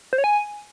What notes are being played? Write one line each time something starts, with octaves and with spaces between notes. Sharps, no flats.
C5
C#5
G#5